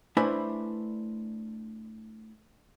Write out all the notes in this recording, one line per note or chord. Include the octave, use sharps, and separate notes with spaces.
A3 D4 E4 B4 C5 G#5